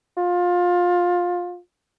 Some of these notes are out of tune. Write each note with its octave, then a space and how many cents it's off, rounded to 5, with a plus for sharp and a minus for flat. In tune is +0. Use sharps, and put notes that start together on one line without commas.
F4 +20